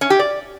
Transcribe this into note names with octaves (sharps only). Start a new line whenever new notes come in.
C#4
G4
D5